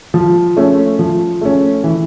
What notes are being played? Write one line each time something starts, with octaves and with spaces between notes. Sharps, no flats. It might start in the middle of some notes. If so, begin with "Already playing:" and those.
F3
A3 C#4
F3
A3 C#4
E3